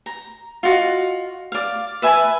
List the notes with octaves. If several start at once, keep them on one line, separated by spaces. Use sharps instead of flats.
A#5
F4 F#4 D#5
D5 F5
B4 E5 G#5 A5